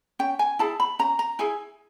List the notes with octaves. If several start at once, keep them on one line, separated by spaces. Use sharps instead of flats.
C#4 G5
G#5
E4 G#4 A5
B5
C#4 A#5
A#5
E4 G#4 G#5